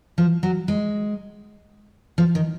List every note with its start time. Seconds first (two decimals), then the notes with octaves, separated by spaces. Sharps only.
0.18 F3
0.43 F#3
0.68 G#3
2.18 F3
2.35 D#3